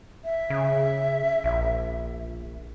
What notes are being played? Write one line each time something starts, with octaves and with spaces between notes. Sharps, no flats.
E5
C#3
A#1